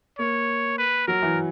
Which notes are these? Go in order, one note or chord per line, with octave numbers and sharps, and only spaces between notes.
A#3 C#5
B4
F#3 A#4
E3